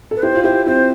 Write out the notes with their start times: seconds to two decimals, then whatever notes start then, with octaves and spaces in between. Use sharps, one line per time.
0.11 A4
0.16 B4
0.23 E4 G4 C5
0.35 F4
0.44 E4 G4 C5
0.66 C4 E4 C5